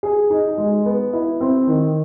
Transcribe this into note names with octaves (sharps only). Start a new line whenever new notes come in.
G#4
D#4
G#3
B3
E4
C4
D#3